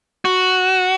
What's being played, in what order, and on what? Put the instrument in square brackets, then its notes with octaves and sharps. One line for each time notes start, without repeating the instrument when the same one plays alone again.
[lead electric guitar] F#4